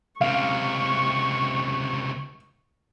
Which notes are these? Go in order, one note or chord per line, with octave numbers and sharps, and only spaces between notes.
C#2 C3 F5 C#6